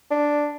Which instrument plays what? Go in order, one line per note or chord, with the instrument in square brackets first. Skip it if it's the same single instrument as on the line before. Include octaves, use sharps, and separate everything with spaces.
[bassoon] D4